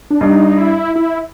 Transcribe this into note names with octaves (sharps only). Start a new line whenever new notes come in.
D4
G2 D#4
E4
E4